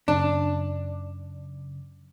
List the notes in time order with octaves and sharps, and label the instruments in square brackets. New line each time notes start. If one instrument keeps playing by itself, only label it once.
[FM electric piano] F#2 C#3 [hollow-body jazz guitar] D4